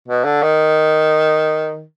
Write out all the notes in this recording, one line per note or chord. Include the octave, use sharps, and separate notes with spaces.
B2
D3
D#3